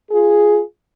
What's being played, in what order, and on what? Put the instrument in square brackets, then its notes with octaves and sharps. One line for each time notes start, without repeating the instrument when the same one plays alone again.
[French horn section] F4 G#4